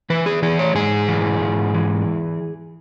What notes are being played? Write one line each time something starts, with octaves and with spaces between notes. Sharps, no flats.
E3 B4
G#4
E3 G#4
C#5
G#2 G#4
E3
G#2
E3